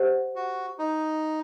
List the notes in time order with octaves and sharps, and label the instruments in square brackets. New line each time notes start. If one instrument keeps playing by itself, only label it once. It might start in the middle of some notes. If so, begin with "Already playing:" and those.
Already playing: [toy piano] G4 C5 D#5 F#5
[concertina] F#4
D#4